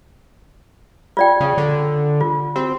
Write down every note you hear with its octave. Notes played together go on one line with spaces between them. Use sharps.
F4 D5 G5
C#3
D3
F4
C4 F#4